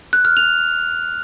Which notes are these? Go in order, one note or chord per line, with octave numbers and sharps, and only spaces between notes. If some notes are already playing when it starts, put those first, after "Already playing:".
F#6
F6
F7